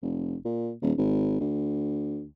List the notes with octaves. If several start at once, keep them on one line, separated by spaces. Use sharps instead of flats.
F1
A#2
D#1
G#1
D2